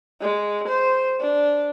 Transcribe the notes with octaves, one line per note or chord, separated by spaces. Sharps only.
G#3
C5
D4